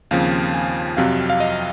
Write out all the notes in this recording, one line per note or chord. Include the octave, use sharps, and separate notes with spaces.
D#2 C#3 F3 C4 F5
G#5
F2 C3 F#3 C4 F5
F5
D#5